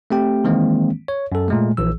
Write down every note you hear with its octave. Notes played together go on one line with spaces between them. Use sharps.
A3 C4 G4 G5
D#3 E3 G#3 A#3 C4
C#5
F#2 A4
A#2 G#3 A3
A#1 E3 E6